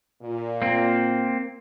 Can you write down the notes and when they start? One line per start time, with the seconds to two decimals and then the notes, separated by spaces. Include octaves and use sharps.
0.21 A#2
0.62 A#3 C4